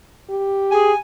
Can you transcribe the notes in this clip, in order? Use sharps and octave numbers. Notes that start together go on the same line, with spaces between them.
G4
G#4 G#5